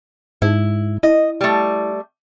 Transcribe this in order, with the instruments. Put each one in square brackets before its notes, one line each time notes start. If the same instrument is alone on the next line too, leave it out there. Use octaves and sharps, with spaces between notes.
[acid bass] G#2 [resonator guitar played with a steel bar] E4
[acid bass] E4 [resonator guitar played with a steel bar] D#5
[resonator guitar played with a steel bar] G3 A3